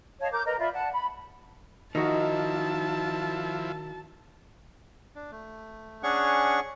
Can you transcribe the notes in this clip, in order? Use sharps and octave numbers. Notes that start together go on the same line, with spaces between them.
C#5 D#5 F5 A5
A#4 D6 G6
A#4 B4 D#5 A#5
F4 D5 E5 B5
D5 F#5 A5
B5
D#3 F3 D#4 E4 F#4 A5
D4
A3
C#4 D4 G#4 C#5 F#5 C#6